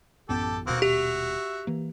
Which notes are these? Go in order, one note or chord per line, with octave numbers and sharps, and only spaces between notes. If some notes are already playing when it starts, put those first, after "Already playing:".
A1 F#2 B3 G4 A4
D#1 B2 A#3 C4 F#4
F#4 G4 E5
E3 A#3